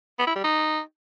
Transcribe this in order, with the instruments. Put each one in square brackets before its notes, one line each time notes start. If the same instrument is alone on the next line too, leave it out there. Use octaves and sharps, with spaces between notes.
[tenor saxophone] B3
E4
G3
D#4